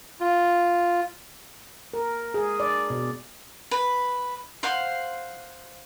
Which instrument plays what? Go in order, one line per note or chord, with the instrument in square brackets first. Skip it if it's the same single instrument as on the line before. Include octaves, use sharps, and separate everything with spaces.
[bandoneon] F4
[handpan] A#4
G#4
D5
B2
[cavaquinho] B4
C5 F5 F#5 C6